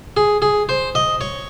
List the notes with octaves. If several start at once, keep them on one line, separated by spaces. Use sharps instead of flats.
G#4
G#4
C5
D#5
C#5